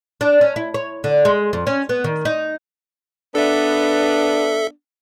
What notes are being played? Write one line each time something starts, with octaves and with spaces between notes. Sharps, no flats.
D4
C#4
E4
C#5
D3
G#3
F2
C#4
B3
D#3
D#4
B3 D4 A4 E5